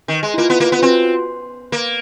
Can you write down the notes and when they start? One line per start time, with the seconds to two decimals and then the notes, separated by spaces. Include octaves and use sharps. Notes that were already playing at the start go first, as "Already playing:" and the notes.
0.08 D#3
0.23 G#3
0.34 E4
0.38 A#3 F4
0.50 B3
0.60 A#3
0.72 B3
0.79 F4
0.82 C4 F#4
1.72 A#3